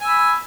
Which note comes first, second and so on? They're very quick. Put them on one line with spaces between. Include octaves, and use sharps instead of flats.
G#5 E6 B5